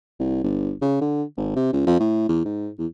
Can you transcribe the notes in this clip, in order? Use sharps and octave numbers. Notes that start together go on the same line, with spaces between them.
C2
G1
C#3
D3
G#1
C3
C#2
F2
A2
E2
G#2
E2